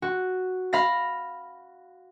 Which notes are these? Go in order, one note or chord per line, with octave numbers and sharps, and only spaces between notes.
F#4
F5 B5 A#6